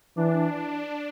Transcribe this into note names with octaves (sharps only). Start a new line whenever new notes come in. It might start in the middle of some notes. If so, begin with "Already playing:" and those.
E3 D4